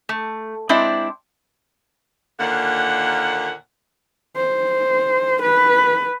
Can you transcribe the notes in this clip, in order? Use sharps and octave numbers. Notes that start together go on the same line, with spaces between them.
A3
G#3 C4 D4 E4 C5 D5
D#2 A#2 D3 F#5
C5
B4